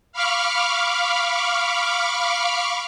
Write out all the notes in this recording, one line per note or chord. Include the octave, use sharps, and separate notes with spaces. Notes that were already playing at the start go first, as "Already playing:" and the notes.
F5 B5 C#6 D6 F6